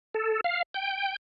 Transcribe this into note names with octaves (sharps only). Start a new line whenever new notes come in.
A4
F5
G5